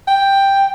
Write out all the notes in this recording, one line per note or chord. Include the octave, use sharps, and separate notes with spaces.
G5